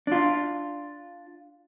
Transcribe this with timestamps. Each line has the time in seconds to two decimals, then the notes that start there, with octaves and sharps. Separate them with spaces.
0.07 D4 F4